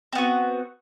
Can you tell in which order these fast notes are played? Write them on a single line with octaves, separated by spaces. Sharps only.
C4 B3 F#4